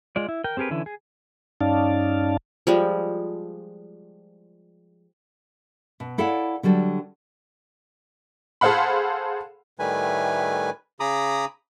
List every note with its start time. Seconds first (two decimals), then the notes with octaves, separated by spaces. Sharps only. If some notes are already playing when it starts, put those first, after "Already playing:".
0.16 G#3 F4 D5
0.29 E4
0.44 A#4 G5
0.57 C4 G4 G#4 A#4 B4
0.70 D3 E3 C#4 E4
0.86 G#4
1.61 G2 C#4 D#4 D5 F5 A5
2.67 F3 G3 G#3
6.00 B2
6.18 E4 A4 C#5 D5 F5 F#5
6.63 D3 F#3 G3 A4
8.61 G#4 A4 C5 F5 F#5 B5
9.79 A2 D#3 G3 A3 B4 G#5
11.00 C#3 G#4 A#5 B5 D6 D#6